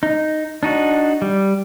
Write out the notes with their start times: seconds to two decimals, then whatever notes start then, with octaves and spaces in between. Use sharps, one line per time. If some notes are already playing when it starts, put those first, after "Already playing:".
0.03 D#4
0.63 D4 D#4 F#4
1.22 G3